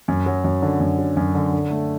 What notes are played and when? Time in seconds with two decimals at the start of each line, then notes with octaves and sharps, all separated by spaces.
0.08 F#2
0.26 F#3
0.44 F#2
0.62 D3
0.80 F#2
0.99 F#3
1.17 F#2
1.35 D3
1.53 D3
1.71 A3